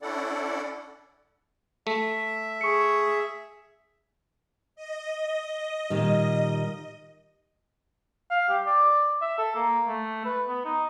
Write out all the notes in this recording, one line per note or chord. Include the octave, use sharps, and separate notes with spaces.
C#4 D4 E4 A4 D5 F#5
A3 E5
G#4 C#6 C#7
D#5
A#2 D#3 G3
F5
G4
D5
E5
A4
A#3
A3
B4
B3
D#4